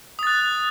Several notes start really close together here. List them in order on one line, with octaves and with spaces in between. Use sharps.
D#6 A6 F#6